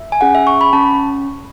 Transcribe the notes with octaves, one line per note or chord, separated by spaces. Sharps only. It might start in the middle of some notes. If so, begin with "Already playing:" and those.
Already playing: E5
G#5
C#4 G#4 F#5
E5
C#6
B5
C#4 A5